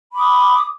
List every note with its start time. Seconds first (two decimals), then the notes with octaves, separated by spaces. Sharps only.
0.13 B5
0.16 D6
0.19 D#6